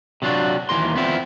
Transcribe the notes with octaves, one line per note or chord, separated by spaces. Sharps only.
C3 F#3 D4 F4 F#4
D#2 E3 A#3 A#4 C6
B3 C4 E4 F4